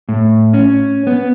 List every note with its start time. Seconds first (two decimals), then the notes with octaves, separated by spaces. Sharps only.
0.09 A2
0.54 C#4
1.07 B3